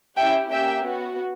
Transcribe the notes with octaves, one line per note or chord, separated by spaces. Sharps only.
C#4 E4 G4 E5 G5
A#3 C#4 G4 E5 G5
B3 F#4